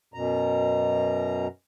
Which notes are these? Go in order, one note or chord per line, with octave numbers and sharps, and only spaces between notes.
F#2 B2 A#5